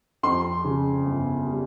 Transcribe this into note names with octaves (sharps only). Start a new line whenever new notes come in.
F2 C6
C#3
G1
G3